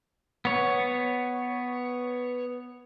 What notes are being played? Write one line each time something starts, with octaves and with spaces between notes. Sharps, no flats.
B3 C#5